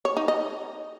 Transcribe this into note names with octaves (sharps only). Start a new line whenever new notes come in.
C#5
D#4
D#5